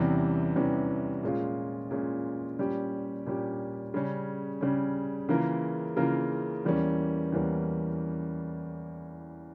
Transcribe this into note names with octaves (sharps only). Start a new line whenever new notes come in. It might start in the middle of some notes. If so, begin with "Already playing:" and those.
Already playing: E2 C3 E3 G3 C#4
E2 C3 E3 G3 C#4
A#2 G#3 C#4 F4
A#2 G#3 C#4 F4
A#2 G3 C#4 G4
A#2 G3 C#4 G4
C#3 G3 C#4
C#3 G3 C#4
C#3 E3 A#3 F4 A#4
C#3 E3 A#3 F4 A#4
E2 E3 G3 A#3 C#4
E2 E3 G3 A#3 C#4